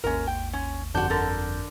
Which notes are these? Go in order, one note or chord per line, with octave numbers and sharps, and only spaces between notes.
G#1 D#2 C#4 A#4
G5
C#4
G1 F2 D4 F#4 G6
D3 A4 A#4